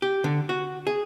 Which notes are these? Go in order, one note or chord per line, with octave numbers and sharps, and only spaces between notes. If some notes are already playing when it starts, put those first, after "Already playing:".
G4
D3
F#4
G#4